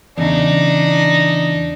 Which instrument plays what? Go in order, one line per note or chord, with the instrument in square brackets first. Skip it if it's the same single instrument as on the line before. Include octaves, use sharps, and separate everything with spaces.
[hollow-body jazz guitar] E2 C#3 [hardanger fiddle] D4 D#4